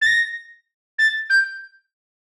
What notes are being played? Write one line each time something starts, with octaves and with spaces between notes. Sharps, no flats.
A6
A#6
A6
G6